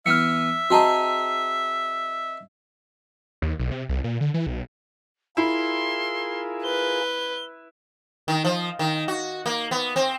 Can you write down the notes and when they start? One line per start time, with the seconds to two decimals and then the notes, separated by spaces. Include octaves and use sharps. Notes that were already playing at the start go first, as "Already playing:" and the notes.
0.06 E3 B3 E5 F6 C#7
0.70 C4 D#4 F#4 G#4 A5 A#5
3.42 D#2
3.59 B1
3.71 C3
3.89 C2
4.04 A#2
4.21 D3
4.34 E3
4.47 B1
5.37 E4 F4 G#4 A#4 C6
6.64 B4 G7
8.28 D#3
8.45 F3
8.79 D#3
9.08 F#4
9.46 A#3
9.71 B3
9.96 C4